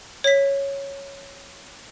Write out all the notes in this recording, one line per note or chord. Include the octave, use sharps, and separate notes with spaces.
C#5 B6